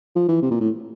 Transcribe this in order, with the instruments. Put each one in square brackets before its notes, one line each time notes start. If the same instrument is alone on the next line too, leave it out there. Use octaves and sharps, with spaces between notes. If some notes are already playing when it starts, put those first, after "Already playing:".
[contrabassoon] F3
E3
C3
A#2
A2